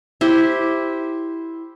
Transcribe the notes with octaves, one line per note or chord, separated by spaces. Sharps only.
E4 G4 C5